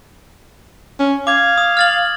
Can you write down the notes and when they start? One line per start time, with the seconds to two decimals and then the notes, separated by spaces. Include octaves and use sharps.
1.00 C#4
1.27 F5 D6 G#6
1.58 D#6
1.77 F6 A6 F#7